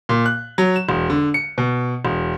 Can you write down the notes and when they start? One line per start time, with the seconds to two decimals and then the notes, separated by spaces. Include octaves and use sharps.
0.09 A#2
0.26 F#6
0.58 F#3
0.76 E7
0.89 E1
1.10 D3
1.34 C#7
1.58 B2
2.05 E1